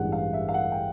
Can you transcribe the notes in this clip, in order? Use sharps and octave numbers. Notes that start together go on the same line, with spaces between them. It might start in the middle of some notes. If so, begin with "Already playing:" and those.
Already playing: A1 G2 E3 G#3 F#5
F5
E5
F5
F#5
G5